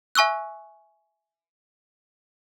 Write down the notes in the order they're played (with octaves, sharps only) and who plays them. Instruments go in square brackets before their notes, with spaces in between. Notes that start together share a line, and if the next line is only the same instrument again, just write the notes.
[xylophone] E5 G#5 C#6 E6 F#6